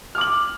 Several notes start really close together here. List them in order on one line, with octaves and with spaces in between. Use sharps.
F6 D6 F#7